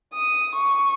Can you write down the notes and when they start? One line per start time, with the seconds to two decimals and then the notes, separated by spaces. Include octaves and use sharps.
0.14 D#6
0.56 C#6